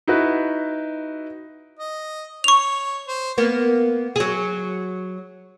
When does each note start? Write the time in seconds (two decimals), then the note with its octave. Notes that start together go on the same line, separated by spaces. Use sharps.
0.07 D#4 E4 F#4 B4
1.79 D#5
2.44 C#5 C#6 F7
3.08 C5
3.38 A#3 B3
4.16 F#3 G#4